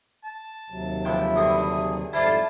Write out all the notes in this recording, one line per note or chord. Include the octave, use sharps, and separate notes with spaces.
A5
D#2 C3 F#3
C#2 F3 E4 G5
G2 D3 C4 D#6
G#4
F2 G#2 G3 E4 F4 C5 D5 A5